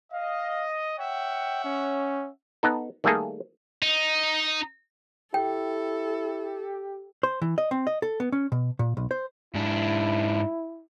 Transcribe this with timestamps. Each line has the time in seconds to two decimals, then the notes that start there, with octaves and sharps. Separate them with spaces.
0.13 D#5 F5
0.98 C#5 E5 F#5 G5
1.64 C#4
2.63 B3 D#4 A4
3.04 D#3 G3 A3 A#3 G#4 A4
3.82 D#4
5.34 E4 G4 A4 G5
7.23 C5
7.42 E3
7.58 D#5
7.71 C4
7.87 D#5
8.02 A4
8.20 B3
8.32 C#4
8.52 B2
8.79 A#2
8.97 B1
9.11 C5
9.55 G#2 D4 E4